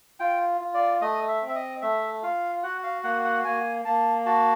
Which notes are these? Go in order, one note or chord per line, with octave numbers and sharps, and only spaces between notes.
F4 G5
F4
D5
A3 D#5
E5
C4
E5
D#5
A3 E5
F4 F5
F#4 F#5
F5
A#3 F#5
F#5
A#3 G#5
A#3 A5
F#4 A5